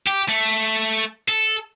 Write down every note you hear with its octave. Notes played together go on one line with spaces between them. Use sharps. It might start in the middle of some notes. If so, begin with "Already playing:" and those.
G4
A3
A4